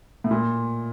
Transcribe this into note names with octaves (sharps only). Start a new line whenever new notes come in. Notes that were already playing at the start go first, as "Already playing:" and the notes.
A2
A#2